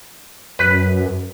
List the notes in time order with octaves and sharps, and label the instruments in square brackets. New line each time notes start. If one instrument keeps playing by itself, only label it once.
[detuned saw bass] F#2 [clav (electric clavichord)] B4